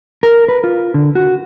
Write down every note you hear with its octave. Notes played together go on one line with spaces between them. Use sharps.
A#4
B4
F4
D3
F#4